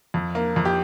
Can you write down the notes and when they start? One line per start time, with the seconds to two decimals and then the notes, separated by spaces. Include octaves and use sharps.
0.14 F2
0.35 A#3
0.56 F2
0.65 G4